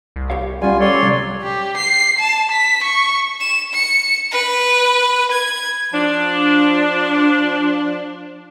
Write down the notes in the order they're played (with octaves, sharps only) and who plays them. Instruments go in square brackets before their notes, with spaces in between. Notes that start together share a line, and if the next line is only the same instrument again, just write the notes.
[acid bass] C2
[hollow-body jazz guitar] G4 C#5 F5
[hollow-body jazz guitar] F#3 C#4 [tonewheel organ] G3 [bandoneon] F4 G#5
[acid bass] A4 [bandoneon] C#5 D5 C6
[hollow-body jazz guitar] C3 [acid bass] F#3 [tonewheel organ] G3
[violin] G4
C7
A5
B6
C#6
E7
C#7
B4
G#6
[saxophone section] F3 D4